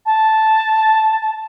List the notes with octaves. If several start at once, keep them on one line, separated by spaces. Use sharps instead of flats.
A5